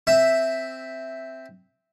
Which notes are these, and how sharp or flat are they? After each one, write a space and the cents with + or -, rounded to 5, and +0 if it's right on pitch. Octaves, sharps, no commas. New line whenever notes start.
C4 +0 E5 +0